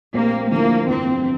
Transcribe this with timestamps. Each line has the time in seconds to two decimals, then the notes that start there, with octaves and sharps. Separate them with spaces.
0.14 A#1 A#2 A3 A#3 C4 G4
0.51 D2 D3 F3 A#3 C4 E4
0.88 G1 F2 E3 C4